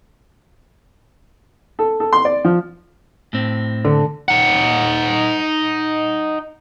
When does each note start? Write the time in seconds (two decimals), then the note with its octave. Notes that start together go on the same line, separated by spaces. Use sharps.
1.79 A4
2.00 A4
2.13 C6
2.25 D5
2.45 F3
3.33 A2 C4
3.85 D3
4.28 D#4 F#5